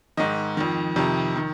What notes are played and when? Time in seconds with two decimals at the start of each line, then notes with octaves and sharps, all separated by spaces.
0.17 G#2 D#3 D#5
0.57 F2 D#3
0.96 F2 C3 D#3
1.36 D#3